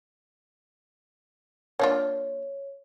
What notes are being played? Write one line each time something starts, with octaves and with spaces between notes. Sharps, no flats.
A#3 D4 F4 C#5